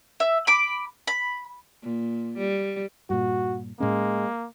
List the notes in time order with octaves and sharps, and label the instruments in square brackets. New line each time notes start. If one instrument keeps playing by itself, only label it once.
[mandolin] E5
B5 D6
B5
[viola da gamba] A#2
G3
[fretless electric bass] G2 A#2 [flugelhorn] F#4
[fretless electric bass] A2 C#4 [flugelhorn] G#3 [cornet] A#3